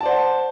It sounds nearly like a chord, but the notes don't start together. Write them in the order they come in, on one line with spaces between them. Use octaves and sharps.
A5 D5 C5 F#5